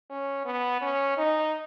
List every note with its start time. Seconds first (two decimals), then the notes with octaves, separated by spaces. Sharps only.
0.11 C#4
0.46 B3
0.82 C#4
1.18 D#4